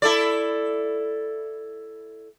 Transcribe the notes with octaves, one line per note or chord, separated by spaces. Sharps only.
E4 A4 D5